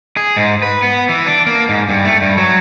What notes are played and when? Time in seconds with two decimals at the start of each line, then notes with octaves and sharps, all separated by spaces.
0.17 G#4
0.36 G#2
0.62 B4
0.82 B3
1.09 E3
1.26 D4
1.46 A#3
1.69 G#2
1.89 G2
2.05 A3
2.22 G2
2.37 F#3